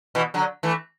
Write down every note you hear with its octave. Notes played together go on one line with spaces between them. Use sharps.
B2 E3
D3 F#3
E3 A3